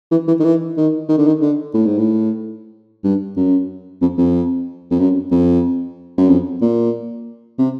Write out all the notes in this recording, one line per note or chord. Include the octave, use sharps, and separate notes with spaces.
E3
E3
D#3
E3
D#3
D#3
D3
D#3
D3
A2
G#2
A2
G2
F#2
F2
F2
F2
F#2
F2
F#2
F2
A#2
C3